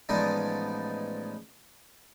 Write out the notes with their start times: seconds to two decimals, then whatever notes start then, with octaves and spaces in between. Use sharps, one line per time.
0.09 A1 F3 G#3 B3 D#4 D5